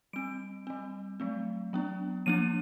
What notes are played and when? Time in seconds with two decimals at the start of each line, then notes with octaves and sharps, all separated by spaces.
0.13 G3 C4 D7
0.67 G3 C4
1.20 F#3 A3 C4
1.73 F#3 B3 D4
2.26 F3 A#3 D4 D#7